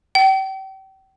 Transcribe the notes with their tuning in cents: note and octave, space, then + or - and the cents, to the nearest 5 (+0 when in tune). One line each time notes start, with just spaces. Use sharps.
G5 -35